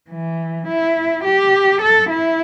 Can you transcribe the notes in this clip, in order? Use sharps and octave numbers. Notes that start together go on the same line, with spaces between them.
E3
E4
G4
A4
E4